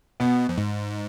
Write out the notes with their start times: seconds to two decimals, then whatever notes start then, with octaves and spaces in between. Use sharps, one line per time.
0.20 B2 B3
0.49 F2
0.58 G#2